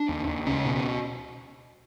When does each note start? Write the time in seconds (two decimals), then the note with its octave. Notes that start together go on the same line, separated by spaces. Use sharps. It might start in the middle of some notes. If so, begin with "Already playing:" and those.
Already playing: D4
0.09 D#2
0.27 D#2
0.46 C#2 C#4
0.65 B2